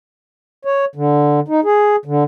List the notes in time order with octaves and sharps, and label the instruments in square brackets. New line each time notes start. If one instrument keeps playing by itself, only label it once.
[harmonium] C#5
D3
D#4
G#4
D3